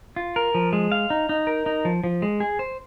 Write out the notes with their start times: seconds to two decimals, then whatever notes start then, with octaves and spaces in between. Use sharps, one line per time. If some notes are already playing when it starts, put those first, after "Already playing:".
0.16 F4
0.36 A#4
0.55 F3
0.73 G#3
0.92 F5
1.10 D#4
1.29 D#4
1.47 A#4
1.66 D#4
1.85 F3
2.04 F3
2.22 G#3
2.40 G#4
2.59 C5